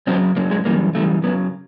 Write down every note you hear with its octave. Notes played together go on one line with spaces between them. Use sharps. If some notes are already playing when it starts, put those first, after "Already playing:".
F#2 C#3 F#3 C4
F#2 C#3 F#3 A#3
G#3
F#2 C#3 E3 G3 A#3
F#2 C#3 E3 G3 A3
F#2 C#3 F#3 B3